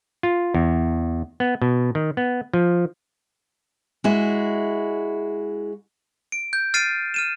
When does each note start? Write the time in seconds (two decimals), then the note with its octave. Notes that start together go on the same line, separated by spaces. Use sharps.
0.23 F4
0.54 E2
1.40 B3
1.62 B2
1.95 D#3
2.17 B3
2.54 F3
4.04 G#3 E4 F#4
6.32 D7
6.53 G6
6.74 F6 A6 C7 D7 D#7
7.14 F6 D#7 E7